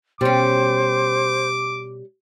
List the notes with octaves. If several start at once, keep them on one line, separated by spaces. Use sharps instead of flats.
B2 G3 C#4 C5 D6